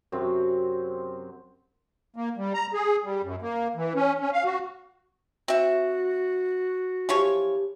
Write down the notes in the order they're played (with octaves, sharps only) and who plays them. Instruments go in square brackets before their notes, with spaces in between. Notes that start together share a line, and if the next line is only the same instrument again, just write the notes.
[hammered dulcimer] F#2 C3 C4
[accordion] A#3
G3
A#5
G#4
G3
F#2
A#3
E3
C#4
C#4
F5
F#4
[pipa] C4 E5 [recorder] F#4
[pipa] E3 F3 C#5 [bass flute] G4